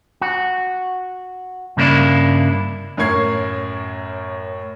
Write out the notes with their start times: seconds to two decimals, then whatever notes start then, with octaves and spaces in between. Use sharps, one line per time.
0.21 F#4
1.77 G2 C#3 A#3 C4 D4 E4
2.97 F#2 A2 A#4 C#6 G#6 C7